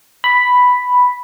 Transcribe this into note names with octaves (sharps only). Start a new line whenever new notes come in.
B5